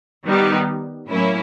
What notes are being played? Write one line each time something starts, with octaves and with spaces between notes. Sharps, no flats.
D#3 G3 B3 D#4
A2 F#3 A#3 C#4 E4